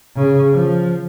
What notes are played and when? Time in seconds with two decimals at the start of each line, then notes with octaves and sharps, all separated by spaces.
0.16 C#3
0.53 F3